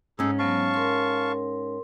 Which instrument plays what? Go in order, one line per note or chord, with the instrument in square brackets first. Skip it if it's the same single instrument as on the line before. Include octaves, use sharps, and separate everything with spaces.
[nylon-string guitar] G#2 C#4 [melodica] D#4 G#4 A4
[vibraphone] F#3 B3 C5 [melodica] F5 A5 C#6
[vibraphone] A#4 C6